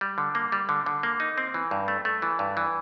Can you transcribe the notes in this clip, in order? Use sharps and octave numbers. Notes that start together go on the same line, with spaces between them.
G3
D3
A#3
G3
D3
D3
A#3
D#4
C4
E3
G2
A3
A3
E3
G2
E3